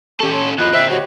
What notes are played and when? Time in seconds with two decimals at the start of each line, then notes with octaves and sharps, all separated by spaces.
0.21 C#4 G4 A4 C#6
0.32 C#5 C6
0.58 D#2 F3 D#5 B5 F#6
0.73 D2 C4 E5
0.90 F#4 G4 C#5 D#5